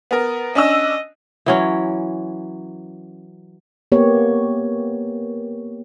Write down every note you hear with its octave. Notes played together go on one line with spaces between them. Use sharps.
B3 A#4
C#4 D4 D#5 E6
E3 F#3 C#4
A#3 B3 G4 C#5